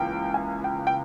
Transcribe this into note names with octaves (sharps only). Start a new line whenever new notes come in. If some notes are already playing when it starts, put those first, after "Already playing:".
Already playing: C#2 C#3 E3 A#3 G5
G#5
G5
G5